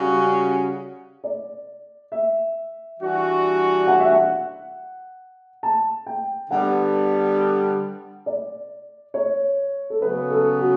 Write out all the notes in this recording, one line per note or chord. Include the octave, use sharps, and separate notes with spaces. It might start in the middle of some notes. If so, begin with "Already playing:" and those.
Already playing: C#3 G3 C#4 F#4
D5
E5
E3 G3 D4 F#4
F#5
E5
F#5
A5
G5
D3 G3 B3 F#5
D5
C#5
A4
C#3 F#3 B3 B4
A4
F#4